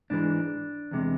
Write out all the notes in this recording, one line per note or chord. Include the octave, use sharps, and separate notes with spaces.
G#2 E3 G#3 D4
E2 C3 G#3